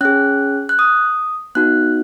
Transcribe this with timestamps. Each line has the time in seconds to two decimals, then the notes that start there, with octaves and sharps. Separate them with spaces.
0.01 C#4 G#4 F#6
0.69 F#6
0.79 D#6
1.55 B3 D#4 F#4 F#6